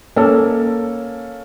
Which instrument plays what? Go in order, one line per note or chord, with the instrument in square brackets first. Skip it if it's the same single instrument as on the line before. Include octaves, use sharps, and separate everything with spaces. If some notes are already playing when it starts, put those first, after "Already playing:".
[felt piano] A#3 C#4 A4